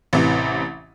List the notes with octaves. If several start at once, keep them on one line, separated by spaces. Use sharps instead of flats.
A1 C3 E3